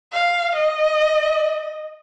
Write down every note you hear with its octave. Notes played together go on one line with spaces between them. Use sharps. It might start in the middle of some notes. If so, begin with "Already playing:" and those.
F5
D#5